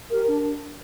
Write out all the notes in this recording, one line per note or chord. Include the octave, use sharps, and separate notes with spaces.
G4 A#4
D4